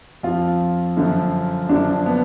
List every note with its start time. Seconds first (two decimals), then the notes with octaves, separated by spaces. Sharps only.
0.23 F2 F3 F4
0.97 F#2 D3 F3
1.69 F#2 D3 F3 D4
2.06 B3